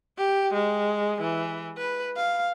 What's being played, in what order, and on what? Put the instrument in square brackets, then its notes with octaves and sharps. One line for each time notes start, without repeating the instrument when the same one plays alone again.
[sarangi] G4
G#3
E3
B4
F5